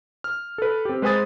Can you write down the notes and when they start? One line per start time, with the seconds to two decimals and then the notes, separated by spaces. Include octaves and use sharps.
0.24 F6
0.58 A4 B4
0.85 C4 G4
1.02 G#3 B4 C5 G#5 D#6 A6